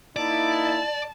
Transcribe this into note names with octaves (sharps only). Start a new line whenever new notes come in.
A#3 D#4 E4 D5 A5